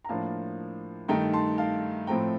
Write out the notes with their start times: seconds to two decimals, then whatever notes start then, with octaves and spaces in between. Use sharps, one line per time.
0.05 A#5
0.09 A2 F3 A#3 D4 F5 A5
1.08 G2 D#3 A3 D#4 G5 A#5
1.33 A5 C6
1.58 F5 A5
2.07 A2 F3 A3 C4 G5 A#5